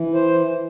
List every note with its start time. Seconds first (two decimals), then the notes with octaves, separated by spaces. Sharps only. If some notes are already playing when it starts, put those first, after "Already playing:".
Already playing: E3
0.14 C5